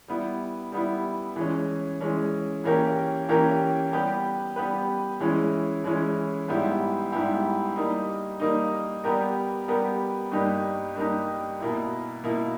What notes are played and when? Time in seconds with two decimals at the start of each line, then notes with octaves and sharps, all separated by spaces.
0.08 G3 B3 E4
0.72 G3 B3 E4
1.36 E3 G#3 C#4
2.01 E3 G#3 C#4
2.64 E3 A#3 C#4 G4 A#4
3.29 E3 A#3 C#4 G4 A#4
3.92 G3 B3 G4 B4
4.56 G3 B3 G4 B4
5.20 E3 G#3 C#4 E4
5.84 E3 G#3 C#4 E4
6.48 G#2 G3 B3 E4 G4
7.12 G#2 G3 B3 E4 G4
7.76 G3 A#3 D#4
8.40 G3 A#3 D#4
9.04 G3 B3 G4 A#4
9.68 G3 B3 G4 A#4
10.32 G2 G3 A#3 D#4 G4
10.96 G2 G3 A#3 D#4 G4
11.60 B2 A#3 E4
12.24 B2 A#3 E4